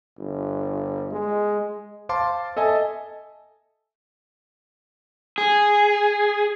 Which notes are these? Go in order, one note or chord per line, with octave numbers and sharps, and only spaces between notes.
G1
G#3
C5 F5 A5 C6 D6
A4 D#5 E5 G#5 A5
G#4